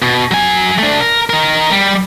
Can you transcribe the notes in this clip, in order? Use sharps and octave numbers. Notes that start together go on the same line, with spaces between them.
B2
F#3 G#5
A3 D4
A#4
D#4 A#4
G3